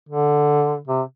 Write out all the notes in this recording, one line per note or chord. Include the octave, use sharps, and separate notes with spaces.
D3
C3